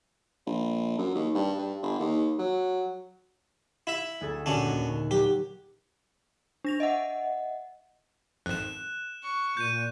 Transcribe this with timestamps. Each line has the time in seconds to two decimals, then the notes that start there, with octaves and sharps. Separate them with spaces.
0.47 A#1
0.98 F#2
1.15 D#2
1.35 G2
1.58 G2
1.82 G1
1.99 D#2
2.39 F#3
3.87 E4 E5
4.21 D2 G#4 A4
4.46 F#2 A#2 D3 C#4 D4
4.65 D#2
5.11 F#3 G4
6.65 D4 A#6 F7
6.80 D#5 E5 F#5
8.46 G#1 F2 F#6 E7
9.23 C#6
9.57 A#2 G6 D#7